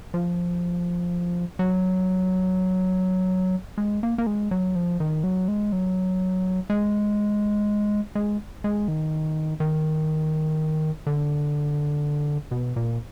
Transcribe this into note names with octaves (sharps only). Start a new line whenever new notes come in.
F3
F#3
G#3
A#3
A#3
G#3
F#3
F3
D#3
F#3
G#3
F#3
G#3
G#3
G#3
D#3
D#3
D3
B2
A#2